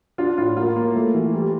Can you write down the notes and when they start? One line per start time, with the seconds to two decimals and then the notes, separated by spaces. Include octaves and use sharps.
0.18 D4 F4
0.38 A2 F4
0.57 A#3 F4
0.76 A#3
0.95 A3
1.14 E3
1.34 G3